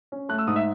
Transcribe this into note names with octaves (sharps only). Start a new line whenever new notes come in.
C#4
A3 F#6
E6
G#2 D#6
E5